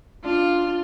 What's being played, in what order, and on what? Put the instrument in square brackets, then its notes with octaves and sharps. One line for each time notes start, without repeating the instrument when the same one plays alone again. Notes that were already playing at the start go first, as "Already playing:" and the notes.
[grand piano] D4 [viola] F4